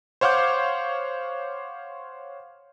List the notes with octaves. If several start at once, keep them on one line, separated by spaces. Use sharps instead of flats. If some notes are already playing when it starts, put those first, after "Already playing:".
C5 C#5 F5 F#5 D6 G6